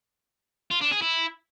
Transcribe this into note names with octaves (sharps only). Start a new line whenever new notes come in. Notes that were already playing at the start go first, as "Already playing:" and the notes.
F4
D4
G#4
E4